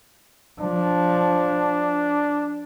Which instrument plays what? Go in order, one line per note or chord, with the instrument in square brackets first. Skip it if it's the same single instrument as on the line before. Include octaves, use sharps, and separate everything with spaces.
[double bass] F3 [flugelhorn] D4